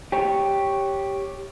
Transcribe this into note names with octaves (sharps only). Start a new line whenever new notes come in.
G4 C#5